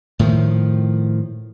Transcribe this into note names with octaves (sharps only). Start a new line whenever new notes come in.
A2 D#3 F3